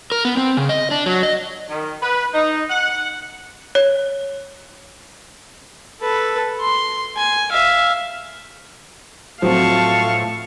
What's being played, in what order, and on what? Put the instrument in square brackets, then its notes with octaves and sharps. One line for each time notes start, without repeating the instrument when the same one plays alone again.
[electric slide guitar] A#4
B3
C4
C#3
D#5
D4
F#3
D#5
[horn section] D#3
B4
D#4
F#5
[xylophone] C#5
[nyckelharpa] A4 B4
C6
G#5
E5 F5
[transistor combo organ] A2 [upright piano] F3 F#3 C4 [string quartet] F5 A5 C#6